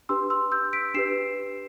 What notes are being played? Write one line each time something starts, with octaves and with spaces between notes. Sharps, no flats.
D4 G4 B4 C6 E6
C6 E6
E6 G6
B6 D7
D4 G4 B4 C7 E7